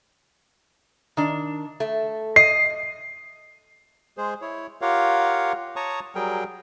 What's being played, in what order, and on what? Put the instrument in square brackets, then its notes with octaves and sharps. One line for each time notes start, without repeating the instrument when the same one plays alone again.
[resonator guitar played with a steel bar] D#3 D4
A3
[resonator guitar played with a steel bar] D#5 [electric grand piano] C7
[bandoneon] G#3 G#4 C5
E4 C#5
F4 G4 A#4 C#5 F5 F#5
C#5 A5 A#5 C#6 D#6
F#3 G3 G#4 A#4 G5